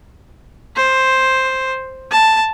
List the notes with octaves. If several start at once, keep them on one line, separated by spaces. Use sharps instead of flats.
C5
A5